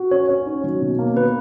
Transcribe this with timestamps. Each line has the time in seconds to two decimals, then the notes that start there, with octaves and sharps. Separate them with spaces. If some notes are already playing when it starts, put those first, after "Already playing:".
Already playing: F#4
0.11 C#4 C#5
0.29 C#4
0.46 D#4
0.64 F#3
0.82 B2
0.99 A#3
1.16 B3 B4